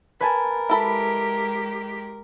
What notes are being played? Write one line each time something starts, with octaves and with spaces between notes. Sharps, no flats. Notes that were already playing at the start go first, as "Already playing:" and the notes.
A#4 B4 G#5 A5
G#3 E4 G4 A4 B5